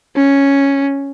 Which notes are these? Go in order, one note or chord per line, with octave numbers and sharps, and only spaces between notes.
C#4